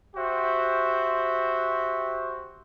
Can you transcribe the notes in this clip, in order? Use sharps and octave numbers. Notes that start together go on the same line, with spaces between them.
F#4 G4 C5 E5